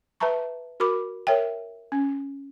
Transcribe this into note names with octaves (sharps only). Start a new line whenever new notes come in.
B4 E5 A5 A#5 C#6
F#4 A#4 B5 D6
A#4 C#5 E5 G5
C#4